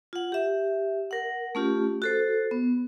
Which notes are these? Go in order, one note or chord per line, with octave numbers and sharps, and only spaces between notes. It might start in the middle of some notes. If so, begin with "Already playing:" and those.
F4 F#5
G4 E5
A#4 F#5
A3 C#4 F4 G4
F#4 A4 C5
B3